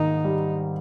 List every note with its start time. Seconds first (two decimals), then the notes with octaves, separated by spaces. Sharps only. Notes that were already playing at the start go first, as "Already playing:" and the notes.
Already playing: G#2 D#3 A#3 D#4
0.24 G3